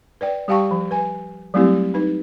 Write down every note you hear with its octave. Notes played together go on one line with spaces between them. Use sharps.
B4 D5 G5
G3 G4 F5 G5 A5 C#6
F3
B4 G#5
F#3 G3 A3 C4 E4 G4
D#4 B4